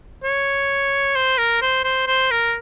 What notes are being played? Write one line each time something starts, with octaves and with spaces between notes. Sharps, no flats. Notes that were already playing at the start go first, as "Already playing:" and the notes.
C#5
C5
A#4
C5
C5
C5
A#4